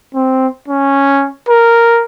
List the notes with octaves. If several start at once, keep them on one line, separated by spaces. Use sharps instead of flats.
C4
C#4
A#4